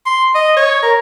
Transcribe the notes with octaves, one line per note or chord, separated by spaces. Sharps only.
C6
D#5
C#5
A#4